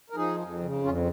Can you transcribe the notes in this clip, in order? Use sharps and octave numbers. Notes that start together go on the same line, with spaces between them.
A#4
F3 D#4 G#4
F2
C#3
F2 C#4 F4